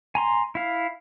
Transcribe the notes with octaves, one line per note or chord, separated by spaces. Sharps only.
G#5 A#5 C6
E4 F5